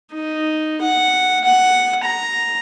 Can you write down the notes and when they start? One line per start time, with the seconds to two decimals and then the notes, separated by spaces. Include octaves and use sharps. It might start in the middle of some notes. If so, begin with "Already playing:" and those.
0.13 D#4
0.81 F#5
1.44 F#5
2.03 A#5